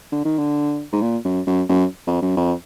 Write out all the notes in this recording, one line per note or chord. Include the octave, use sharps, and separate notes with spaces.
D3
D#3
D3
G#2
A#2
F#2
F#2
F#2
F2
F#2
F2